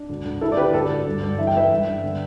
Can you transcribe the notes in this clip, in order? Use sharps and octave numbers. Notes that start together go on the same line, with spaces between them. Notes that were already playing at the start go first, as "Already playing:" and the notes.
Already playing: D4
D2
D2
D2 E4 A4
D5
D3 G4 B4
D2 A4 D5
D2
G2
G2
E3 E5
G5
E3 B4 E5
G2
G2
D3